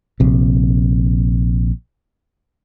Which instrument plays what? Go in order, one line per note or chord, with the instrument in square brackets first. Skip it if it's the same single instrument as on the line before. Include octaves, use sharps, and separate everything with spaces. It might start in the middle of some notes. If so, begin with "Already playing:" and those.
[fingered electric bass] A#1 C3